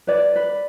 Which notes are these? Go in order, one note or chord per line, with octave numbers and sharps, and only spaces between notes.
B4 D5
B4